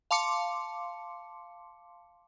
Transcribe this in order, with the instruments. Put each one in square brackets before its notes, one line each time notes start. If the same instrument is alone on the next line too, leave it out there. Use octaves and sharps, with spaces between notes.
[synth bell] F5 A5 C6 D6 C#7